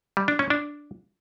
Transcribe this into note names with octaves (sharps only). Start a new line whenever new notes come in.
G3
D4
C#4
D4